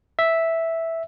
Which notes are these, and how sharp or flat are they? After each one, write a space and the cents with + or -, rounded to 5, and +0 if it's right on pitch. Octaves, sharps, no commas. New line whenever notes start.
E5 -5